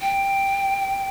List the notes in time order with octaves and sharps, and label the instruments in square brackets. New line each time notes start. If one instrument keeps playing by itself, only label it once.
[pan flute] G5